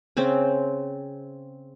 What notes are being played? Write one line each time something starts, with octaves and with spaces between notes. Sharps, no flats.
C#3 C4 C5